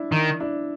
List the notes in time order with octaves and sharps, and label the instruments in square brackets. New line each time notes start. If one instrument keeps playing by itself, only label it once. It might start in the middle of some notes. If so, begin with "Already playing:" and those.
Already playing: [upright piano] D4 E4
[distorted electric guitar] D#3
[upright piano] D4 E4